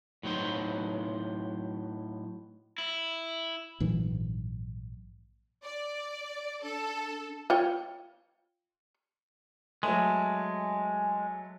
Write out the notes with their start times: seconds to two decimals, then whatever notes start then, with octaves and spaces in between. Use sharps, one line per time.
0.23 A2 F#3 D#4 C5
2.78 E4
3.80 A#1 G#2 E3 F#3
5.63 D5
6.63 D4 A4
7.50 F4 C#5 G5
9.83 F#3 G#3 A3